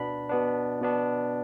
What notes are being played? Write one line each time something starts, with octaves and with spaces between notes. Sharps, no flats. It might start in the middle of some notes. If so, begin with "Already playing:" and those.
Already playing: B2 B3 D4 B5
B2 B3 D4
B2 B3 D4